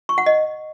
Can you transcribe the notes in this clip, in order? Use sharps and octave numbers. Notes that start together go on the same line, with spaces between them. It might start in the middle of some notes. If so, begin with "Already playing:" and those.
C#6
F#5
D#5